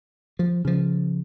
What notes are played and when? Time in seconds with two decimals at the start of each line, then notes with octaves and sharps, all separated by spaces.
0.39 F3
0.65 C#3 F3